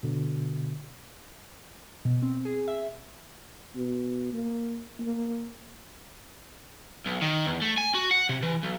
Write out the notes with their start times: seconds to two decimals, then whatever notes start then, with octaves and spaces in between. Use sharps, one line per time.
0.03 B2 D3
2.05 B2
2.22 C4
2.45 G#4
2.68 E5
3.75 B2
4.32 A#3
4.99 A#3
7.06 B1
7.21 D#3
7.46 E2
7.62 A3
7.78 G#5
7.95 F#4
8.11 F#5
8.29 C3
8.43 E3
8.63 B1